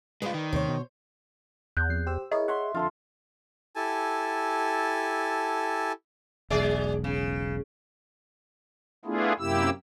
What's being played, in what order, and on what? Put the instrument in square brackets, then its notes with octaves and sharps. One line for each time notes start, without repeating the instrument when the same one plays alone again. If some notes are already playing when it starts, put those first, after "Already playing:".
[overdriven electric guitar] G#3 F4 [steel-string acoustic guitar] B4 D5
[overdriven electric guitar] D#3
[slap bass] D#2 C3 A3 [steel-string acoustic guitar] C5 C#5
[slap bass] B2
[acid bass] E2 [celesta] F#6 G6
[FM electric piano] F2 C7
G4 C5 E6
[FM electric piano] E4 A#4 C#5 [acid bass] G#4 [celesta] D#5
[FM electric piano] C#5 F#5 [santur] E5 C6
[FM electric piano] F2 D3 [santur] F4 A4 C6
[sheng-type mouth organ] E4 G4 A4 G#5 A5
[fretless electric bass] E1 B1 [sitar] G#3 G#4 D5
[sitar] C#3
[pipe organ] A3 B3 D4 E4 F4 G#4
F#2 C3 A#3 E4 G4 E6